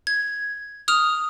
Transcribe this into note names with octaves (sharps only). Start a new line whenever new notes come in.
G#6
D#6 F6 F7